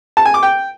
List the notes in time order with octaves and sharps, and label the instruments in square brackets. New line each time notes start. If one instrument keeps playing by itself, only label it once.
[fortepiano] A5
G#5
D6
G5